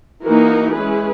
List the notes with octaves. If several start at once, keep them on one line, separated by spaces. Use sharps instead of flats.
E3 A#3 D#4 F#4 A#4
G#3 C#4 E4 G#4 B4